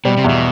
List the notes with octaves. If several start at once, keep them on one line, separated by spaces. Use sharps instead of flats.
B2 G3
C3
E2 B2